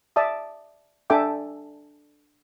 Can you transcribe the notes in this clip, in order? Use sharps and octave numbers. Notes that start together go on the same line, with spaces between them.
D5 E5 A5 D#6
D4 A4 E5 G5 G#5 D6